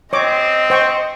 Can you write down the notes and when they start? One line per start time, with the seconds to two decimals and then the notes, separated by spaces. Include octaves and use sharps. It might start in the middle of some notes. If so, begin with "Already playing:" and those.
0.13 C4 C#5 D#5 D6
0.70 C5 G5 C#6